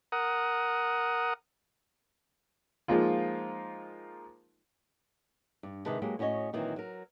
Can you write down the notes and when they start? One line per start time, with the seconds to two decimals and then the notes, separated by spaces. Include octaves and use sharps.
0.12 A#4 F#5 D#6
2.88 F3 G#3 A#3 D#4 F4
5.63 G2
5.86 C3 D#3 G#3 B4 A5
6.02 F#3 G#3 A#3 G4
6.19 A2 C#4 F#4 C#5 D#5
6.53 A#2 D#3 E3 F#3 C4
6.76 F#3 A#4